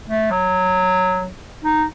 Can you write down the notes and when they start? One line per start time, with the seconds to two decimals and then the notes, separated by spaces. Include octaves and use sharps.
0.09 A3
0.31 F#3
1.64 D#4